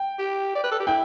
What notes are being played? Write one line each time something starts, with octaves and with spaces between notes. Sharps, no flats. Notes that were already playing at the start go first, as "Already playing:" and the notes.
Already playing: G5
G4
D5
B4
A4
G4
E4 G5